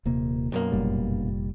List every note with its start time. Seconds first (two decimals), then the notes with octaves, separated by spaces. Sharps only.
0.06 D#1 C3 A#3
0.52 B1 F#2 A#3
0.72 F1 A#2 G3